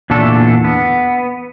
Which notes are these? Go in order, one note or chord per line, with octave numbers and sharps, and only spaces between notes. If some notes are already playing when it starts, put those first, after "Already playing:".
E2 A#2 D3 A3 D4 A4
B3